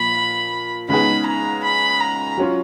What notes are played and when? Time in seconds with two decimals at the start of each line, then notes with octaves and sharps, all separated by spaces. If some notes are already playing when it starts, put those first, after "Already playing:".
Already playing: A#2 F3 B5
0.89 C#3 G#3 B3 D#4 G#4 B5
1.26 A#5
1.64 B5
2.00 A#5
2.37 F#3 C#4 F4